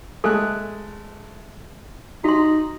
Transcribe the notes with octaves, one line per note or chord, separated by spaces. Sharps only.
G#3 A3 A4 F#6
D#4 F#4 C6